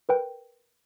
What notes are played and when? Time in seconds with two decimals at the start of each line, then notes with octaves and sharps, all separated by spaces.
0.09 A#4 B4 G5